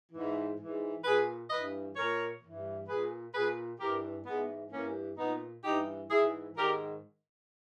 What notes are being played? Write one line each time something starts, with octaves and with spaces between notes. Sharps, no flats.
G#2 E3
G#2 E3
A#2 G#4 B4
G2 E3 B4 D#5
A#2 A#4 C#5
G2 E3
A#2 G#4 B4
A#2 G#4 B4
G2 E3 G4 A#4
G#2 E3 G#3 B3
G2 E3 A#3 C#4
A#2 B3 D#4
G2 E3 D#4 G4
G#2 E3 E4 G#4
G#2 D#3 G4 A#4